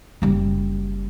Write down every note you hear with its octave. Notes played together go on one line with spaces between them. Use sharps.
F#1 G3